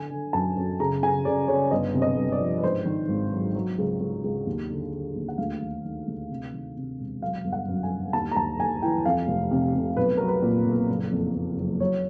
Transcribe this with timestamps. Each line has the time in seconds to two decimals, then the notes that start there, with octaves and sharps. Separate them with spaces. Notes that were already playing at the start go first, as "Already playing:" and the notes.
Already playing: D3 G#5
0.10 D3
0.33 F#2 A5
0.56 F#2
0.80 C#3 A#5
1.03 C#3 G#5
1.25 C#3 D5
1.48 C#3 C#5
1.71 G1 D#5
1.94 C3
2.02 D#5
2.17 G1
2.32 D5
2.40 F3
2.58 B4
2.63 G#2 C5
2.85 D#3
3.08 G#1
3.32 F#3
3.55 F#3
3.78 C#2
4.00 C#2
4.24 C#2
4.47 D#2
4.70 D3
4.92 D3
5.16 D#2
5.28 F#5
5.38 D2 F5
5.62 D#3
5.84 D#3
6.08 D2
6.30 C3
6.53 D#3
6.77 C3
6.99 E1
7.21 F#3 F5
7.45 G1
7.53 F#5
7.68 F#2
7.83 G#5
7.91 G1
8.13 D#2 A5
8.32 A#5
8.36 D#2 A5
8.59 D#2 G#5
8.82 E3 G5
9.05 F2 F5
9.28 F1
9.51 C3
9.74 C3
9.97 B1 B4
10.17 F#3 A#4
10.28 B4
10.43 A#2
10.66 B1
10.89 F#1
11.11 F2
11.34 F2
11.57 F#1
11.80 F#3 C#5